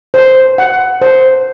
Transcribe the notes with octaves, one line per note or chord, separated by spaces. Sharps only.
C5
F#5
C5